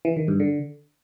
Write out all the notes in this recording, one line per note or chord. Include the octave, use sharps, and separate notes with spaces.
E3
D#3
G2
D3